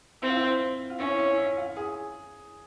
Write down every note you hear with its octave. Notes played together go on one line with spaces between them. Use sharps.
C4 E4
F4
E4
F4
C#4 E4
E4
E4
F4
G#4